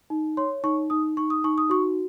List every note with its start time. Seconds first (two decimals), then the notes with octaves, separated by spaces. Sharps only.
0.10 D#4
0.37 C#5 C6
0.64 D#4 C#6
0.90 D#4 D#6
1.17 D#4 C#6
1.30 D#6
1.44 D#4 C#6
1.58 D#6
1.70 F#4 C#6